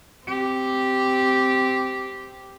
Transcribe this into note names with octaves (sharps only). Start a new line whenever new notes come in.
C4 G4